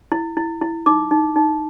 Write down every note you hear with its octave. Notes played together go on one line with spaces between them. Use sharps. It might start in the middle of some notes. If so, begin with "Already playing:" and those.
E4
E4
E4
D#4 D6
D#4
D#4